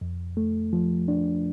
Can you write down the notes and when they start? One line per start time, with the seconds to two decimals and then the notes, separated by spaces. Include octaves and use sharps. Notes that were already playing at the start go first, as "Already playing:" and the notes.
0.01 F2
0.37 A3
0.73 F3
1.08 D4